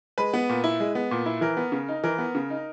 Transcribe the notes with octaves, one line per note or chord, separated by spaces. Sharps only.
G#3 B4
B3
A#2
E4
G#3
B3
A#2
E4
E3 A#4
B3
C#3
D#4
E3 A#4
B3
C#3
D#4